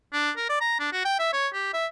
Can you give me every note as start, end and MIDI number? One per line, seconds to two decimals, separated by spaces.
0.13 0.31 62
0.37 0.47 70
0.49 0.59 74
0.61 0.77 82
0.80 0.90 62
0.92 1.01 66
1.05 1.16 79
1.19 1.30 76
1.33 1.48 73
1.53 1.73 67
1.73 1.86 76